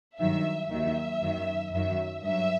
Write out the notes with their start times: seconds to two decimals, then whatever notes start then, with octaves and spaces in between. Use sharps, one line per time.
0.19 G2 D#3 F#3 E5
0.70 D#2 D#3 F#3 E5
1.22 F#2 D#3 F#3
1.72 F#2 D#3 F#3 E5
2.24 G2 F#3 E5